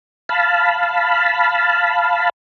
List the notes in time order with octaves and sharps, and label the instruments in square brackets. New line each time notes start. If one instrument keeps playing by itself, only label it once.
[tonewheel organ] F5 A5 B5